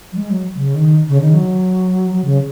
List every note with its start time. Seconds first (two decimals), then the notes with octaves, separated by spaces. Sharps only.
0.13 F#3
0.17 G#3
0.30 F#3
0.55 C#3
0.75 D#3
1.08 C#3
1.21 D#3
1.34 F#3
2.11 F#3
2.24 C#3